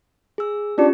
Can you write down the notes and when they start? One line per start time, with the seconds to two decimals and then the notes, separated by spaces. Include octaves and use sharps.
0.38 G#4 E6
0.78 C#4 D4 F4 G4